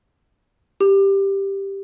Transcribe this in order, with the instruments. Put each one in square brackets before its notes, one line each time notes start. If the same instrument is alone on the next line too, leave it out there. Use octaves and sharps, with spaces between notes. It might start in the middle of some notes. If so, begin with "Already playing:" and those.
[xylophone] G4